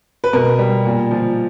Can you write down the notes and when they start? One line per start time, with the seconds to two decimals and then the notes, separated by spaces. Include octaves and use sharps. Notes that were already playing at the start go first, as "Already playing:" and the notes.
0.24 B4
0.33 B2 A#4
0.59 G3
0.85 A#2
1.11 F3